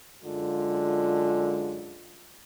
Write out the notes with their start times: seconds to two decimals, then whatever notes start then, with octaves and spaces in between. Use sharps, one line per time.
0.24 F#2 D3 G#3 F4